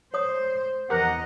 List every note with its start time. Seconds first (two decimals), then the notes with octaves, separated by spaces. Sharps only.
0.14 C5 C#5 D#6
0.90 E2 G4 A#4 D#5 F#5 A#5